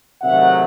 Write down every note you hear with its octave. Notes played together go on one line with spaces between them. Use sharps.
C3 D#3 F#3 A3 E5 F#5